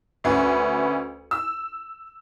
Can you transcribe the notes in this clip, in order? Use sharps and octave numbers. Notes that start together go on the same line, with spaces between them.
D2 C#4 B4
E6